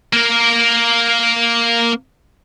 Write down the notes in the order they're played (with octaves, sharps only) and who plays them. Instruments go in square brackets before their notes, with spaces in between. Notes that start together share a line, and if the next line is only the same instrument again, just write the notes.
[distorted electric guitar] A#3 A#4